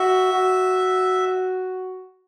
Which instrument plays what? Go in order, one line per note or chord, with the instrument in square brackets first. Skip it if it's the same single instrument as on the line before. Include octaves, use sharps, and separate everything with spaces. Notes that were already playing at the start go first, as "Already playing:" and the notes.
Already playing: [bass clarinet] F#4 [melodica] E5
[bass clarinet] F#4